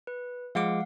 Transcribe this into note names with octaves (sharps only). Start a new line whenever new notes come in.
B4
F3 G#3 F5 F#5 D6